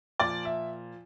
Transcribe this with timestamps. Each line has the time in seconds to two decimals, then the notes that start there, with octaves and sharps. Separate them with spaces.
0.20 A#2 F3 D5
0.45 E5